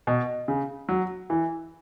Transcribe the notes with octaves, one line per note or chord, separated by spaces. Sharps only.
B2
C#3
F#3
E3